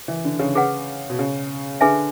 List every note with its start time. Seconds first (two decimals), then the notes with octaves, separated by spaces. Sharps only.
0.08 E3
0.25 D3
0.39 C#3
0.55 G#4 B4 F#5
1.10 B2
1.19 C#3
1.81 D3 G#4 B4 E5 G#5